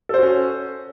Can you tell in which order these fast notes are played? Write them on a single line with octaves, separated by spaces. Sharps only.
A4 C5 F#4 C#4